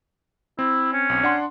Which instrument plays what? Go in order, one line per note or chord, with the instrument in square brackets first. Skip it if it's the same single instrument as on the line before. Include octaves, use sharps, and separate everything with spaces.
[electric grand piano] C4 [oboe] E4
[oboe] C#4
[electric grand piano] B1 C4
D4 F#5 C6